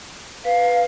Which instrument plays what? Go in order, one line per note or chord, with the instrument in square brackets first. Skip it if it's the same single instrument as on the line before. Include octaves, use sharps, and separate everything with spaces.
[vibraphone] B4 [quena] F5